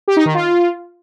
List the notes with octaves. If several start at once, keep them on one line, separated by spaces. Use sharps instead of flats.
G4
D#4
D#3
F4